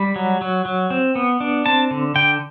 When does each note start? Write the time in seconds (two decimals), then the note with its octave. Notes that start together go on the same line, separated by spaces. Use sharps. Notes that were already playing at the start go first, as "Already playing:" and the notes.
Already playing: G3 B5
0.16 F#3
0.41 F#3
0.65 F#3
0.90 C4
1.15 B3
1.40 D4
1.66 C4 A5
1.91 D3
2.16 D3 G5